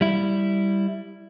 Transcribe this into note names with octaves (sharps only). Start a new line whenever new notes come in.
G3 E4